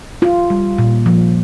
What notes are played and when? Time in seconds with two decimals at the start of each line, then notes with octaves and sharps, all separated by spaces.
0.22 F4
0.50 G3
0.78 A#2
1.06 F3